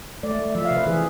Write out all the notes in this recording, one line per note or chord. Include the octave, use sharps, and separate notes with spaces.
A3 D5
A3
F3 E5
F5
C3
B4
E3 G#4